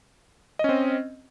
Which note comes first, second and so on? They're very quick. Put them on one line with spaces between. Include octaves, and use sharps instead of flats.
D#5 C#4 C4